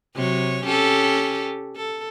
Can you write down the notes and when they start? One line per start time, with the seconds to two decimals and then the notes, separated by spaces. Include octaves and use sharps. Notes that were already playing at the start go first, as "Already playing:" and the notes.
0.16 C3 F#3 C#5
0.65 C#4 G4 A4
1.76 A4